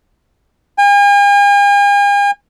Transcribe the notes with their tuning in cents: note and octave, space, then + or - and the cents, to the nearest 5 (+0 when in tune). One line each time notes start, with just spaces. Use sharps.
G#5 -45